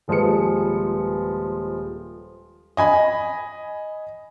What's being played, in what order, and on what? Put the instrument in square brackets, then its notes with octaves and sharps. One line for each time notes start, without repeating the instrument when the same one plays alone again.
[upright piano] D#1 F3 G#3 B4 C#7
D#5 G#5 B5